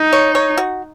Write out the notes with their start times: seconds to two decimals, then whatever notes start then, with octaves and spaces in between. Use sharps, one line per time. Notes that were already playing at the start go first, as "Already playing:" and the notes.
Already playing: D#4
0.12 C#5
0.35 C#5
0.58 F#4